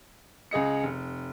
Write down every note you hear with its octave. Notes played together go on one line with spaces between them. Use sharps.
C#2 G#4 D#5 C#7
F1